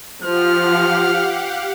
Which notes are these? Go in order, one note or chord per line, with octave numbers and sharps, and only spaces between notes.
F3 G4 F5 F#5 F6